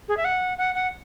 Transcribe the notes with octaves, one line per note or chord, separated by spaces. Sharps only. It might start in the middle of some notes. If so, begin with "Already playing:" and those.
G#4
E5
F#5
F#5
F#5